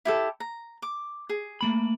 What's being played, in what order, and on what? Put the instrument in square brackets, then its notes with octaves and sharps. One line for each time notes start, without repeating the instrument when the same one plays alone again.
[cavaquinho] E4 G4 A4
A#5
D6
G#4
[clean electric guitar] A3 A#3 B5